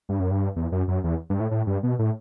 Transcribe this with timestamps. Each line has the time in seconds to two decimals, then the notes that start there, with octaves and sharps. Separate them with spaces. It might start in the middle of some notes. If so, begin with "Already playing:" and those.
0.09 G2
0.20 F#2
0.31 G2
0.56 E2
0.72 F#2
0.88 F#2
1.04 E2
1.30 G2
1.40 A2
1.51 A2
1.67 G2
1.83 B2
1.99 A2